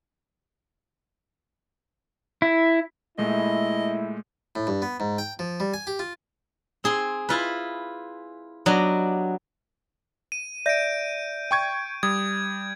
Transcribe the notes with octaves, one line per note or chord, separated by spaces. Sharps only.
E4
A#2 G#3 A3 E4 D#5
A2
G2
B3
G#2
G5
F3
G3
G#5
G4
F4
C4 G#4 C6
E4 F4 B4
F#3 B3 D4 G4 D#5
D#7
D5 E5 G6 A#6 D7
G5 C#6 G#6
G3 D#6 G#6